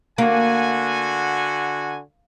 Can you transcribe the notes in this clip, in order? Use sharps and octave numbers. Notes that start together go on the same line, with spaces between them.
D3 A#3 F#4 G#5